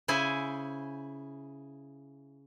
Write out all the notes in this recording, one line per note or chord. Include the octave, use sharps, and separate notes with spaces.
C#3 E4 C5 G#5